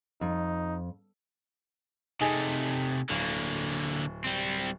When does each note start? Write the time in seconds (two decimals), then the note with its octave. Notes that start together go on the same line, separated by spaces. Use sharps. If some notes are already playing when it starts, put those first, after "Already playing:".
0.21 F2 D#4
2.21 C3 A3 D#4 G#4 G#5
3.10 D1 D3 A#3
4.24 G3 C4